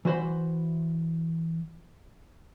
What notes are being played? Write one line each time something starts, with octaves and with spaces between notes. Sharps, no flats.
E3 F#4 C5 B5 C6